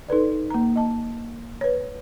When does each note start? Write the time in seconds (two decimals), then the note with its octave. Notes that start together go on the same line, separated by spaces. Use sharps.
0.08 D#4 A4 B4 D5
0.50 A#3 A#5
0.76 D#5 A5
1.61 B4 C#5